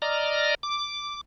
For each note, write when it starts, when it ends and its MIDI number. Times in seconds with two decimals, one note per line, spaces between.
0.02 0.55 74
0.02 0.55 75
0.02 0.55 82
0.02 0.55 89
0.63 1.21 86